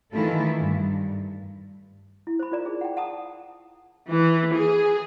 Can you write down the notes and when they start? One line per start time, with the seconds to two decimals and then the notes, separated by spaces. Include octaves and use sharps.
0.13 D#3 E3 A3 E4 F4 A4
0.58 G2
2.27 E4
2.39 C5 B5
2.52 F4 A#4 D5 A#5
2.65 D#4 G#4
2.81 F#5 G5
2.97 F#5 A5 A#5 D#6
4.09 E3
4.53 G#4